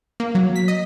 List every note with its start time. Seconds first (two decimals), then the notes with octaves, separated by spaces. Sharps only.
0.20 A#3
0.35 F#3
0.56 B6
0.68 D#5